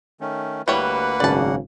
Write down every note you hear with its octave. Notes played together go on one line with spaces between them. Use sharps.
D#3 A3 C#4
D2 G3 A#3 E4 B4 C#5 F#5
G#1 F#2 C#3 D5 A5